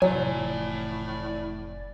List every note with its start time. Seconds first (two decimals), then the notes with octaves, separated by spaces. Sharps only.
0.02 F1 A2 E3 F#3 D5 G#5